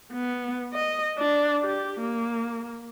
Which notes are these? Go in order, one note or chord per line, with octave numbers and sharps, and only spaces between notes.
B3
D#5
D4
G4
A#3